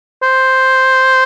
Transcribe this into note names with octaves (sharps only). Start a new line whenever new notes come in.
C5